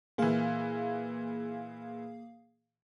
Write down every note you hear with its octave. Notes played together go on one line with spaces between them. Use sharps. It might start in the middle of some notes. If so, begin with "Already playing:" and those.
A#2 E3 A#3 G#4 F5